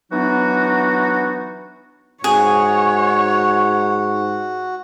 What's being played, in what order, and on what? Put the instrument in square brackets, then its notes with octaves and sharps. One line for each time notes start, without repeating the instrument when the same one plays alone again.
[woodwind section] E3 F#3 B3 D4 D#4 F#4
[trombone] G#2 [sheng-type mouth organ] F#4 [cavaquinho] G#4 [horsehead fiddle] C#5